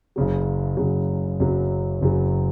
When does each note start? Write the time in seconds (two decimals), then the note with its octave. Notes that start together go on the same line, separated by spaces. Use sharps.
0.16 F#1 F#2 C#3 F#3
0.77 F#1 F#2 C#3 F#3
1.39 F#1 F#2 C#3 F#3
2.01 F#1 F#2 C#3 F#3